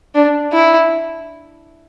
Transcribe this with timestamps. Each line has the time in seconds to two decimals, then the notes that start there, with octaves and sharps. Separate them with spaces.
0.14 D4
0.52 E4